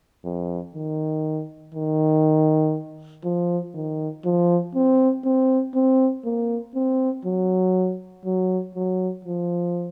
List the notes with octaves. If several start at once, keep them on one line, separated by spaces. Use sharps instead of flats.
F2
D#3
D#3
F3
D#3
F3
C4
C4
C4
A#3
C4
F#3
F#3
F#3
F3